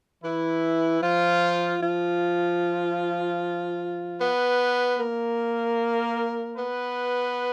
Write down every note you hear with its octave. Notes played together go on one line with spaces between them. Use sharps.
E3 E4
F3 F4
F3 F4
B3 B4
A#3 A#4
B3 B4